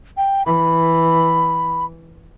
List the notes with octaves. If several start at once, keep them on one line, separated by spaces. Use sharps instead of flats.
G5
E3 B5